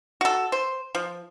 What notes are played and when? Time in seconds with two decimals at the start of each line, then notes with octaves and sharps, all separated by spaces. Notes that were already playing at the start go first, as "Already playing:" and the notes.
0.21 F#4 A4
0.52 C5
0.95 F3